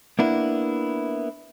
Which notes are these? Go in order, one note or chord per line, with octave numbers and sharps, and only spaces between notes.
A#3 B3 D4 E4